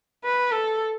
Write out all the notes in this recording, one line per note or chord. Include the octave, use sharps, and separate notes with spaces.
B4
A4